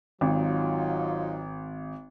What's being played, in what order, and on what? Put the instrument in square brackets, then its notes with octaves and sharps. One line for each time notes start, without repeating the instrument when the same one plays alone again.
[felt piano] G#1 [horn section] F#3 D#4 F4